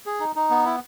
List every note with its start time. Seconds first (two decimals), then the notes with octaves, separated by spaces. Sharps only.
0.06 G#4
0.20 D#4
0.36 D#4
0.50 B3
0.65 E4